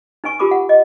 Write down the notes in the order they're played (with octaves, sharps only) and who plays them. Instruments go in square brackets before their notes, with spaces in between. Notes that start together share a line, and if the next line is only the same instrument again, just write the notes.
[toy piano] D#4 B4 G#5 C#6
F4 G4 A#4 B5 D6 D#6
F#5
D#5